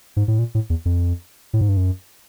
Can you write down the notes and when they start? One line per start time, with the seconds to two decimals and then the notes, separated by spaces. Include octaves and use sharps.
0.16 G#2
0.28 A2
0.39 A#2
0.55 A2
0.70 E2
0.85 F2
1.53 A2
1.61 G#2
1.69 G2
1.77 F#2